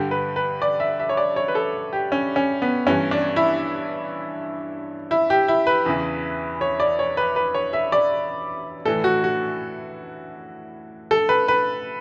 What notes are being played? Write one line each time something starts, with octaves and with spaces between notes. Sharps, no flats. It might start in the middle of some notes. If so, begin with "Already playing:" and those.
Already playing: G2 D3 G4
B4
B4
D5
E5
E5
C#5
D5
C#5
B4
A4
G4
C#4
C#4
B3
G2 E3 C#4
D4
E4
E4
G4
E4
B4
E2 C#3 E3
C#5
D5
C#5
B4
B4
C#5
E5
D5
A2 E3 A4
F#4
F#4
A4
B4
B4